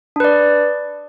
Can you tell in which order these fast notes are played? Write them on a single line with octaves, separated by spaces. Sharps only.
D4 B4 D5